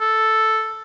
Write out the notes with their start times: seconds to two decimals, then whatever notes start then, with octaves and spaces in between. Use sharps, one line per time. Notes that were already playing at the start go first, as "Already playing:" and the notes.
0.01 A4